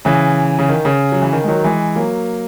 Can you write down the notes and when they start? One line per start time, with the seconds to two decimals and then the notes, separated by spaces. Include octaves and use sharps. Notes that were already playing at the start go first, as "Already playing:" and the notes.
0.05 C#3 E3
0.59 C#3
0.69 D#3
0.85 C#3
1.12 F#3
1.22 E3
1.33 D#3
1.44 G#3
1.48 D#3 F#3
1.64 E3 G#3
1.96 F#3 A#3